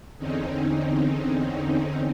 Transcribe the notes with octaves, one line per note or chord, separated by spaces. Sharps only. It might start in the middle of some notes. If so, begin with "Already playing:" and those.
E2 D3 C4 C#4 D#4